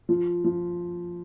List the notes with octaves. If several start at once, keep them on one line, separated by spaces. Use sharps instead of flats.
F3
F3